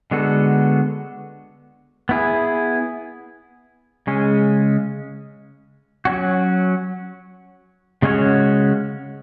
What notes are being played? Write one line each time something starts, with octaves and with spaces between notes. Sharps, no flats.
D3 G#3 B3 F#4 A4
B3 E4 G#4
C#3 G#3 C#4
F#3 C#4 F#4
C#3 G#3 C#4 F#4 C#5